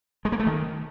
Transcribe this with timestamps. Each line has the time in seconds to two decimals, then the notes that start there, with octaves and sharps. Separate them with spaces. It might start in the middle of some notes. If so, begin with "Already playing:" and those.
0.25 G#3
0.32 A#3
0.40 A3
0.47 D#3